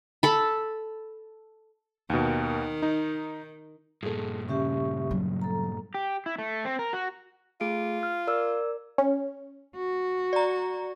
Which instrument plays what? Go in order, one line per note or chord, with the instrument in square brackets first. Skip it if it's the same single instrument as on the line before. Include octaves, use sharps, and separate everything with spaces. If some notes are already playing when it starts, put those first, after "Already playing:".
[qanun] A4 B5
[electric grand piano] D#2 B2 [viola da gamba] D#3
[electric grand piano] D#4
[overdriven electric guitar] G2 A#2 [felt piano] G#4 A4
[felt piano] C#3 [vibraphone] G4 E5 C#6
[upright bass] F#3
[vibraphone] A4 A#5
[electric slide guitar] G4
E4
A3
C4
A#4
F#4
[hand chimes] A3 G#4 D7 [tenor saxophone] F4
[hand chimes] F6
A#4 D5 E6
[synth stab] C#4
[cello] F#4
[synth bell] D5 A#5